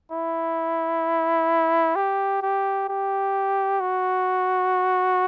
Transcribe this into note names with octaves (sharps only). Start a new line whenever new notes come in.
E4
G4
G4
G4
F#4